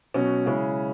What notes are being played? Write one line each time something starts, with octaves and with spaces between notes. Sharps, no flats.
B2 F#3 C#4
C#3 G#3 C#4 E4